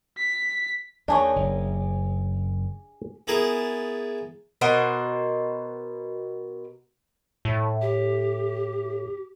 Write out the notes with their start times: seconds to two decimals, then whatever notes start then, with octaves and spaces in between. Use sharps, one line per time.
0.17 B6
1.08 D#2 D4 G4 G#4 C#5 D#5
1.36 F#1
3.27 B3 E4 G#4 A#4 A5
4.61 B2 A#4 C5 F#5
7.45 A2
7.81 G4